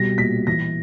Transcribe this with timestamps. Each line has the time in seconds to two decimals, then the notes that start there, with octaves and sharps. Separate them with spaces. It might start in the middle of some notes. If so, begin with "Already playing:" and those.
Already playing: B2 G3 A#6
0.18 A#2 B6
0.47 E3 A#6